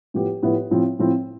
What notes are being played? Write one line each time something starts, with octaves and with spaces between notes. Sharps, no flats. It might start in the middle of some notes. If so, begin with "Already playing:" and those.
A2 F3 B3 E4 G4
A2 F3 B3 E4 G4
A2 F3 C4 E4
A2 F3 C4 E4